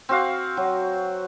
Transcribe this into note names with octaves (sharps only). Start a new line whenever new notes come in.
C4 F#4 F5
F#3